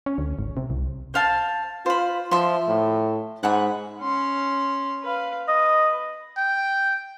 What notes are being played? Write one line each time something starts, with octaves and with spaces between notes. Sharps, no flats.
C#4
D2
G#1
C3
C2
C5 F5 A5
F4 C5 B5
F3 E5 C6
A2
G#2 F#5 G#5 B5
C#4 C6
B4 F5
B4 D#5
G5